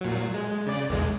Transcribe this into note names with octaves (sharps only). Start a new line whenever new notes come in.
A#2 F#3
G#3
C#3 D5
B1 E2 G#3